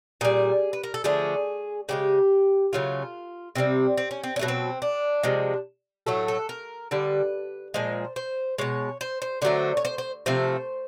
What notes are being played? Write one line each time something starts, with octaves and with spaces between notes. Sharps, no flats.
A#2 G3 G#4
B4
A#4
A4
D3 F3 A3 G#4
C#3 F3 G#3 G4
C#3 F#3 A3 F4
C3 D#3 G3 C4
C4
C#4
C4
C#4
B2 F#3 A3
C4
D4
C3 F3 G#3
A2 F#3 A3 A4
A4
A#4
D3 G3 B4
A#2 F3 G#3 C5
C5
B2 G#3 C#5
C5
C5
D3 F#3 A3 C5
C#5
C5
C5
C3 F3 A3 C5